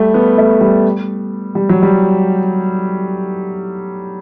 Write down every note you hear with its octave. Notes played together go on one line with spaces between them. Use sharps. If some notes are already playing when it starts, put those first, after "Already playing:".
Already playing: G3 A3
B3
A3
G3
G3
F#3
G3